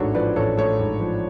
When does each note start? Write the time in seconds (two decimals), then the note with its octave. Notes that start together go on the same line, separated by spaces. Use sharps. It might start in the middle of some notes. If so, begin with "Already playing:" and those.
Already playing: A1 G#2 A3 D4 F#4 A4 C#5
0.15 F3 B4 D5
0.36 A1 A4 C#5
0.57 A3 A4 C#5
0.79 G#2
1.00 F3